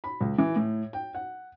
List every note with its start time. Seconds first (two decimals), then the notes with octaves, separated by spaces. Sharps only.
0.04 B5
0.20 C#2
0.38 E3
0.56 A2
0.93 G5
1.15 F#5